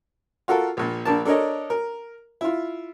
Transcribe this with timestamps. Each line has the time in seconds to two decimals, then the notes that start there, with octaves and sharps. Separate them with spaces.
0.48 F4 F#4 A4 A#4
0.77 A#1 A#2
1.05 A#1 D4 A#4 A5
1.25 D4 A4 A#4 C#5 D#5
1.70 A#4
2.41 E4 F4